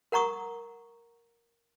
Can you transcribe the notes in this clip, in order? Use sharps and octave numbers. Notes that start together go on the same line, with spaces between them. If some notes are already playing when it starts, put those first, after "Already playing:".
A#4 F#5 A#5 C#6 D#6